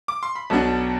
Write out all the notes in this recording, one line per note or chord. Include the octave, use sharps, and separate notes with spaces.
D6
C6
B5
B1 B2 B3 D4 A5